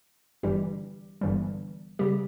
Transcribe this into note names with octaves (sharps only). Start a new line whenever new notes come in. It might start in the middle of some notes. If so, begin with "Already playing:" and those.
G1 G2 E3 G3 G4
G1 G2 E3 G3
C#3 G3 G4